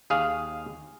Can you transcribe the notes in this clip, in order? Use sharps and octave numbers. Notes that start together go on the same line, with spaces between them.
D#2 G#4 F5